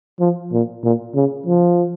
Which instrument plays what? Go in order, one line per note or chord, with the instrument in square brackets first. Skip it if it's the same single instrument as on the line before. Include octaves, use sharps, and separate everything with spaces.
[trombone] F3
A#2
A#2
C#3
F3